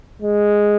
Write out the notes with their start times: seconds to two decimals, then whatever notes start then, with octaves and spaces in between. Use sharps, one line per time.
0.22 G#3